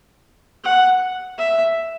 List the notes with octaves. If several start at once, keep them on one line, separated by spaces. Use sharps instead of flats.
F#5
E5